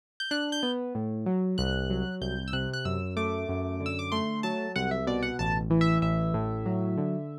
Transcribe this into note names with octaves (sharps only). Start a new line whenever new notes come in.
G6
D4 F#6
G6
B3
A2
F#3
C2 F#6
F#3
C2 G6
E6
C3 F#6
F#6
F#2 E6
A3 D6
F#2
D3
E6
D6
A3 C6
F#3 A5
C2 F#5
E5
B2 D5
F#5
A1 A5
E3
E5
A1 E5
A2
F#3
D3